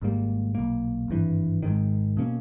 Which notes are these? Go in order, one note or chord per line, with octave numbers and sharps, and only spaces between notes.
G#1 G#2 G3 A#3
B1 A#2 A#3
G#1 G2 E3
G#1 G#2 D#3
B2 A#3 C#4